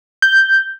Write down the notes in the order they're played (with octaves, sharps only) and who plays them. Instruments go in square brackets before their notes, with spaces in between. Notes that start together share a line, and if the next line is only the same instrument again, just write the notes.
[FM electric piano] G6